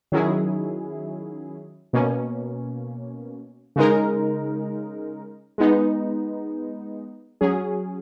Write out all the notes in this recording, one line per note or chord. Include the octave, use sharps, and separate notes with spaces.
D#3 F#3 C#4 E4 G#4
B2 A#3 C#4
C#3 G#3 D#4 A#4
G#3 B3 D#4
F#3 C#4 G#4